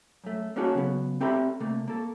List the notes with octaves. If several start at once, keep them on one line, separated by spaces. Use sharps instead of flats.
F#2 A3
A#3 C#4 D#4 F#4 G#4 A4
C#3 F#3 B3
C4 G4 A4 E5 A#5 B5
C3 A3 A#3
A#3 A4